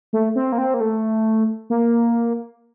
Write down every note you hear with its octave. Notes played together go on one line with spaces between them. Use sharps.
A3
C4
A#3
C4
A#3
A3
A#3